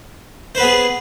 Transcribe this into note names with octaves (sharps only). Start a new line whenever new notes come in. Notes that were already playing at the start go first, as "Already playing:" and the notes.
B3 G#4 B4 C5